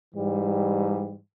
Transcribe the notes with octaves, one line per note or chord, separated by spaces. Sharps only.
G#2 E3 G3